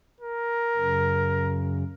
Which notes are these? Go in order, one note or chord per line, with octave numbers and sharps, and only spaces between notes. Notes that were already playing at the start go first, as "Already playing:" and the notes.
A#4
F#2 C#3